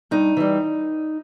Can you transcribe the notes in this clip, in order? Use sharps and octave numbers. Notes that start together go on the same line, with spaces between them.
G2 D#4
E3 G3